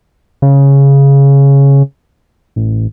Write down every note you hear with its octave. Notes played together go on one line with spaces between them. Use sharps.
C#3
A1